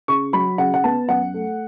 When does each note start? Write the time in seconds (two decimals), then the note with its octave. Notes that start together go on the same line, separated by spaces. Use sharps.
0.08 C#3 C#6
0.33 F#3 B5
0.58 C#3 F#5
0.74 F#5
0.84 B3 A5
1.09 F#2 F#5
1.34 A3